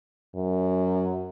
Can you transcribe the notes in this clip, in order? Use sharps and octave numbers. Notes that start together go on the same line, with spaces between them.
F#2